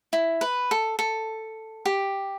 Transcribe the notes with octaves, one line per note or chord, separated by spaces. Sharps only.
E4
B4
A4
A4
G4